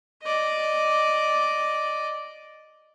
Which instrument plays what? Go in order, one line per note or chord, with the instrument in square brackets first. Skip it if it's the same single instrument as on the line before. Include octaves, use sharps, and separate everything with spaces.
[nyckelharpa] D5 D#5